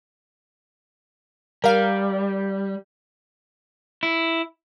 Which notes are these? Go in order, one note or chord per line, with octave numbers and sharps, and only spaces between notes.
G3 A#4 F5
E4